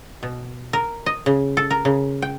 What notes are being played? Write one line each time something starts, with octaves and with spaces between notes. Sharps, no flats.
B2
A#4
D#5
C#3
A4
A#4
C#3
G5